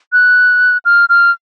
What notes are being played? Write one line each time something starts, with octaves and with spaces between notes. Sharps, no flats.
F#6
F6
F6